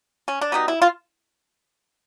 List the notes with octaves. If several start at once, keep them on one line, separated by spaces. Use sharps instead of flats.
C#4
D4
B2 G3 B3 D#4
E4
F4